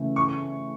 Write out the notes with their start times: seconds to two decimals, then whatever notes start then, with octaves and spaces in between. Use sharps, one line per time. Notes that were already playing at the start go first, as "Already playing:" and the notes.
Already playing: C#3 E3 A3
0.16 C#6